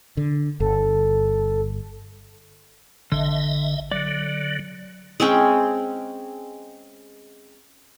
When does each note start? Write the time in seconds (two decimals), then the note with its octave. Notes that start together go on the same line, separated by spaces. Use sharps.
0.17 D3
0.60 G1 A4
3.12 A1 D3 D#5 E5
3.91 D3 F#3 D5
5.20 G#3 C4 C#4 G5